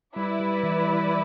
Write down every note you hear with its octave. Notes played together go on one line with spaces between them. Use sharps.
G3 E4 B4 D5
G3
E3
G3